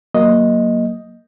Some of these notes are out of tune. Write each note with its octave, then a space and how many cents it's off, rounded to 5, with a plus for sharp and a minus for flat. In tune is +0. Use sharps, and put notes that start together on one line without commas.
F#3 +0 A#3 +0 D#5 +0